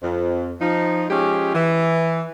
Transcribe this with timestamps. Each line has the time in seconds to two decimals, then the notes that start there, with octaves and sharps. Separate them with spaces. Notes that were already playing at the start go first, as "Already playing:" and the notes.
0.03 F2
0.61 F3 D#4
1.10 F3 G#3 C#4 G4
1.55 E3